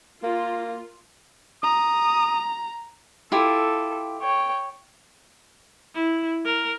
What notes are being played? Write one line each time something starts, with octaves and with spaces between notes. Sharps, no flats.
A#3 F4
A#5 D#6
E4 F4 G4 A4
C#5 G5
E4
A#4